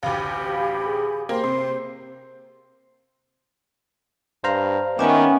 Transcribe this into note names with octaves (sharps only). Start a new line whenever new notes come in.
A1 D2 G4 F5 B5
G#4
A#3 G4 A#4 C5
C3 C6
G2 C5 F5 A#5
D#3 B3 C#4 E5 G5 G#5 C#6 D6